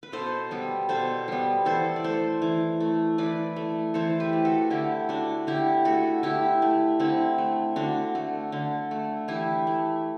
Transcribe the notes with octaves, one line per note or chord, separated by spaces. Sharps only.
B4
B2 A4 C5
G3 B3
B2 A4 C5
G3 B3
E3 A4 C5
D5
A3 A4 C5
E3
A3
E3 B4 D5
A3
E3 A4 C5
G4 B4
A3
F#4 A4
D3 E4 G4
A3 D4 F#4
D3 E4 G4
A3 F#4 A4
D3 E4 G4
A3
D3 C4 E4
A3
D3 D4 F#4
A3
D3
A3
E3 E4 G4
A3